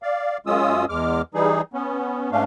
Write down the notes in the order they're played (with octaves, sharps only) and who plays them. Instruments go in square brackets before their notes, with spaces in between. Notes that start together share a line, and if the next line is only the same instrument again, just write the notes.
[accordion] D5 F5
F#2 G#3 C#4 F4 D#6 E6
E2 G#3 D6 F6
E3 G3 D#4 G#4
B3 C#4
G#2 A3 C#4 D4 F5